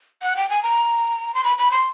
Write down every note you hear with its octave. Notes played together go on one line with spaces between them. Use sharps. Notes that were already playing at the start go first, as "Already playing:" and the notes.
F#5
G5
G#5
A#5
C6
B5
B5
C6